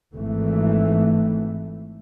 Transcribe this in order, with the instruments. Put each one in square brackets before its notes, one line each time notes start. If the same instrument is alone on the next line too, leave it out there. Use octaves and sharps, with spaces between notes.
[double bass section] G#1 E3 A3